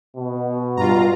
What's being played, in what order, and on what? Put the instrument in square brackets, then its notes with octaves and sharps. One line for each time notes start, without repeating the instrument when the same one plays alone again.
[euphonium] B2
[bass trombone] G2 [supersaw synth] F4 A#5